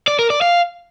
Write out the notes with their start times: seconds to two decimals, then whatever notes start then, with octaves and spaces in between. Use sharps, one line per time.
0.08 D5
0.19 A#4
0.30 D5
0.41 F5